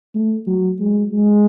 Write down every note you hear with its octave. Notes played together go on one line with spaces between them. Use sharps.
A3
F#3
G#3
G#3